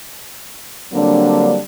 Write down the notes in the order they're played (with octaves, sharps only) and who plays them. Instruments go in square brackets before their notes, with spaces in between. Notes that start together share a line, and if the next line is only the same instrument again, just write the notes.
[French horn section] D3 F#3 G3 A#3 C4 D4